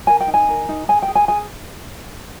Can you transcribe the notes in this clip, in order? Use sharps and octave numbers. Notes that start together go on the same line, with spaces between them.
A#4 G#5
G5
D#4
G#5
A#4
D#4
G#4 G#5
G5
G#4
G#5
G#4 G#5